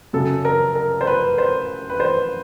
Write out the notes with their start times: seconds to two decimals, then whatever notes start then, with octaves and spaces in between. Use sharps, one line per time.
0.13 F#2 C#3 F#3 A4
0.45 A#4
0.75 A#4
1.01 C5
1.07 B4
1.38 C5
1.90 B4
2.00 C5